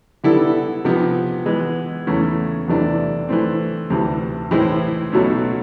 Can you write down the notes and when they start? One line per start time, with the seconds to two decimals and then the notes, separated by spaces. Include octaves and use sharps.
0.24 D3 G3 B3 E4 A4
0.85 C3 F3 G#3 B3
1.45 E3 G#3 B3
2.07 E2 C#3 E3 A3 C#4
2.68 E2 C3 E3 A3 D4
3.29 E3 A3 C4
3.90 D2 C3 E3
4.51 A2 E3 G#3 C4 E4
5.12 B1 B2 F#3 A3 C#4